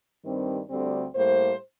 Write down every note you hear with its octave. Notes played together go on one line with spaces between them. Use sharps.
G2 D#3 G3 C4
D2 D3 G3 C4
A2 G3 A#3 C5